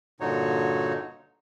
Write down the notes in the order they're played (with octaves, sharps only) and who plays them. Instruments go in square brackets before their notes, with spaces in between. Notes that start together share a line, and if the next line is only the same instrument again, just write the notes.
[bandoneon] G2 A#2 D3 D#4 F#4 C#5